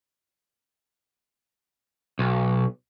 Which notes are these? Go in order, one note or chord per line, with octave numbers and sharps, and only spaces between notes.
B1